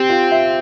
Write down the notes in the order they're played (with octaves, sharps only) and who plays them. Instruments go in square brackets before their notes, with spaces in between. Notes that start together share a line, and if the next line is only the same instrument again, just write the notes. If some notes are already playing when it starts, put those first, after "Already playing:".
Already playing: [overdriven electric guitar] C4 [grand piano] G4
[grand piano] F4
E5